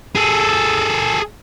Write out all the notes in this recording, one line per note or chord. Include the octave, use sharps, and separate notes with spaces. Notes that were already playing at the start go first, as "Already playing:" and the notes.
G#4 A4